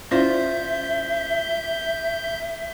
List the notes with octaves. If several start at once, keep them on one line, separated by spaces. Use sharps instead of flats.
C#4 E4 F4 C5 D5 E5 G6